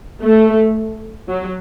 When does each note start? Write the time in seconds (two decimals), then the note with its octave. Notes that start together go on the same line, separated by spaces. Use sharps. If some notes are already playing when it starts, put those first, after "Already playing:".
0.24 A3
1.30 F#3